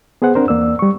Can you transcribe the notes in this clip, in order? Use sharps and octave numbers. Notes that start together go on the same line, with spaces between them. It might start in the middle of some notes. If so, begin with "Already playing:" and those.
B3 G#4 C5 F#5
C4 D4 A#4 C5
E2 A#3 D5 E6
G3 C#6